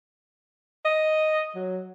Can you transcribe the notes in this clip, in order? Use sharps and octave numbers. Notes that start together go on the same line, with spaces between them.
D#5
F#3